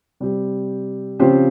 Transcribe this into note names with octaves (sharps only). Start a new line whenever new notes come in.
C3 G3 C4 G4
C#3 F3 C4 G4 C5